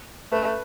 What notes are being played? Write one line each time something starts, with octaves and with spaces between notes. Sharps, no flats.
A3 B4